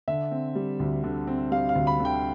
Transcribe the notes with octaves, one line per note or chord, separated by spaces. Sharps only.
D3 E5
C4
G3
D2
D3
C4
G3 F5
F5
D2
B5
D3
G5